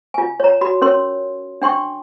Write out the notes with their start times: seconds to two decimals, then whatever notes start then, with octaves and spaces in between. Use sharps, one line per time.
0.14 F4 G#5
0.40 C#5 A#5
0.61 F#4 B5
0.82 C#4 A#4 C#5 C6
1.62 D4 G5 C6 C#6